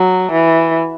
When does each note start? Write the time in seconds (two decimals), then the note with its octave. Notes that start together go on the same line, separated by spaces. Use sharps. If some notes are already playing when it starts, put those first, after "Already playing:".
Already playing: F#3
0.32 E3